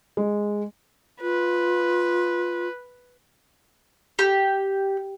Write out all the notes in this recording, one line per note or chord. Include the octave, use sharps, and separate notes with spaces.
G#3
F4 B4
G4